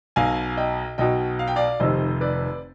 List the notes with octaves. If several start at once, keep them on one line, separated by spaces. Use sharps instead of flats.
B1 B2 F5 G#5
D#5 G5
B1 B2 D#5 G5
F5
G5
D5 F5
F1 F2 C3 D#3 C5 D#5
B4 D5